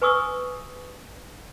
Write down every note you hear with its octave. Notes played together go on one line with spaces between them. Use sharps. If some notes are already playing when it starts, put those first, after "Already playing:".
B4 G#5 C#6 D#6 E6